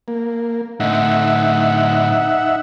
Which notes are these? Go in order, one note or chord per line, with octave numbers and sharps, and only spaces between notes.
A#3
A2 D3 D#4 E5 F#5